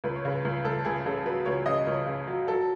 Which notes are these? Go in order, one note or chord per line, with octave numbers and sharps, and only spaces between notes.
C#2 B4
C#5
C#3 B4
C#2
C#2 A4
C#2 G#4
C#3 A4
F#3 B4
C#2 C#5
C#3 D#5
C#2 C#5
C#3
F#3
F#3 A4